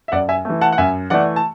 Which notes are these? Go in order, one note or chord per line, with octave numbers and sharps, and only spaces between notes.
E5
F#2 D5 F#5
E5 G#5
E3 A3
F#5 A5
F#5
F#2 E5 G#5
E3 A3 D5 F#5
A5